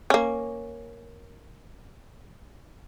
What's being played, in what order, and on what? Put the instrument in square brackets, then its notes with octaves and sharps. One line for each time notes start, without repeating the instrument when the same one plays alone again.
[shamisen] A#3 C#4